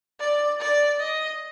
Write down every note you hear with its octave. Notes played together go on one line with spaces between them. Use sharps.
D5
D5
D#5